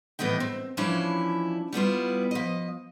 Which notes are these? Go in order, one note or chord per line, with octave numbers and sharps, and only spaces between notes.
A2 E3 B3 D#5 G5
C4
E3 F3 C#4 D4 E4
G3 B3 E4 F4
F3 D#5